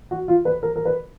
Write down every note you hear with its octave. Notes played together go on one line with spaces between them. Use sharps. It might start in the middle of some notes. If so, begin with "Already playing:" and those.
F#4
F4
B4
A#4
A#4
B4